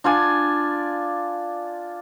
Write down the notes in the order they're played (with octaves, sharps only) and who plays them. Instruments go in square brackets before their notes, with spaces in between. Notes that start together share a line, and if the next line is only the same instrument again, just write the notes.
[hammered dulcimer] D4 F4 D5 G#5